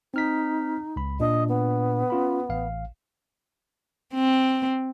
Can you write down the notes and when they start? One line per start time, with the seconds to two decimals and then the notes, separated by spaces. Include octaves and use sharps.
0.14 C4 D#4 F6 B6
0.96 C#2 B5
1.20 A#2 D4 D#5
1.48 B3
2.10 C#4 F4 B5
2.49 A1 F5
4.14 C4